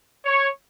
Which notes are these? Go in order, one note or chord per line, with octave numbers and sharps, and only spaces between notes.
C#5